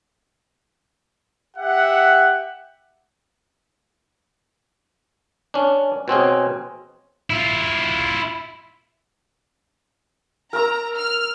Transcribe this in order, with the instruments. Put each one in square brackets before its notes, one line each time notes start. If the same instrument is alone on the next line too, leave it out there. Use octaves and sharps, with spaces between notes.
[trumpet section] G4 E5 F#5
[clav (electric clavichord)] C#4 D4
B2 C4 C#4 G#4
[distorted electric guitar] E4 F4
[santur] A#4 E6 [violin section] A#5
[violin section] F6